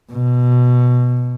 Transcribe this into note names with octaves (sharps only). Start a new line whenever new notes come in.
B2